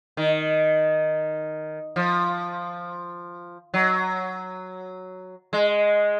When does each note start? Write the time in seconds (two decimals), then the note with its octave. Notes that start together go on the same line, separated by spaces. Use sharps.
0.17 D#3
1.96 F3
3.74 F#3
5.53 G#3